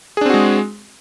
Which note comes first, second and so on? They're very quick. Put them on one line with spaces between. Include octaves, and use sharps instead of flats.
G#4 D4 C4 F#4 G#3